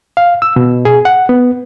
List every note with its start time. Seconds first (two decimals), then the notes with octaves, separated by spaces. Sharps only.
0.17 F5
0.42 E6
0.56 B2
0.85 G#4
1.05 F#5
1.29 B3